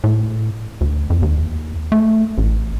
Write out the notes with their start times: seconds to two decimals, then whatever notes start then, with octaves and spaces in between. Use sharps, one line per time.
0.04 A2
0.81 D2
1.10 F2
1.22 D#2
1.92 A3
2.38 A1